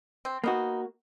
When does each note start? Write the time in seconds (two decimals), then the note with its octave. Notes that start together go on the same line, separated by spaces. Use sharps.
0.25 C4
0.44 A#3 B3 D#4 F#4